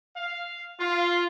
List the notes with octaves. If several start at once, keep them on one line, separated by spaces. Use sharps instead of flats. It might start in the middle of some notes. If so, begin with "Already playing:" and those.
F5
F4